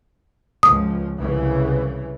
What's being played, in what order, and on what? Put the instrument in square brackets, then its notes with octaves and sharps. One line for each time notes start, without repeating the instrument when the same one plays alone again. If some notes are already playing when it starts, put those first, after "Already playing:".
[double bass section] C#2 F3 [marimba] D#6
[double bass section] C2 C#3 E3